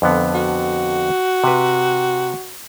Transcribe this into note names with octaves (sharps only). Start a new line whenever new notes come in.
F2 D3 B3
F#4
C3 B4